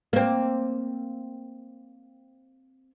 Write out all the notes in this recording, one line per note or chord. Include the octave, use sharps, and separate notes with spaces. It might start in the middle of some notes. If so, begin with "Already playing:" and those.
A#3 C4